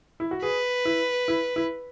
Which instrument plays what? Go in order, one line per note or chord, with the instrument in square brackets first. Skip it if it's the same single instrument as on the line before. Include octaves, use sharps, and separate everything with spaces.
[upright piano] E4
F#4
[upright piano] G#4 [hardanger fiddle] B4
[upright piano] E4
E4
E4